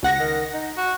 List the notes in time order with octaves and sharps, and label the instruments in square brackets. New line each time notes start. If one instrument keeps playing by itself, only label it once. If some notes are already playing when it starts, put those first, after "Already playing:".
[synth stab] C#2 F#5 A#6
[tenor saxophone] D#3
D#4
F#4